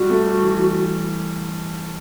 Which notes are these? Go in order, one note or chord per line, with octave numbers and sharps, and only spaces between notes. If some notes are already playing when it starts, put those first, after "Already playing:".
Already playing: G3 F#4
A3
G3
E3
E3